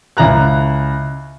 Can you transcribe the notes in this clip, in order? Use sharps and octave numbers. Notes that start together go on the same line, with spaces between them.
C#2 E4 A#5 F#6